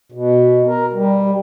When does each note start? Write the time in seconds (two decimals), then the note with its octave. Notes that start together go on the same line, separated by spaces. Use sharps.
0.12 B2
0.67 A#4
0.93 G3